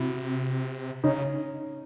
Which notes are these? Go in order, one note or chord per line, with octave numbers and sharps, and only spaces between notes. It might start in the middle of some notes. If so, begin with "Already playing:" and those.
Already playing: C3 E4 F#4
C#3 C#4 D#4